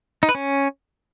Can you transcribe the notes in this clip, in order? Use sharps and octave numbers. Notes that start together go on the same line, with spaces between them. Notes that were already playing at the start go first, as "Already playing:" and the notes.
D#4
B4
C#4